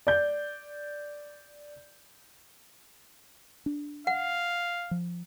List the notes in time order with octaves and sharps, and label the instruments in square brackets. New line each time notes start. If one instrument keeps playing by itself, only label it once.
[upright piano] D5 G6
[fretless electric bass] D4
[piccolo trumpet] F5 [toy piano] F#5
[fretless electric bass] F3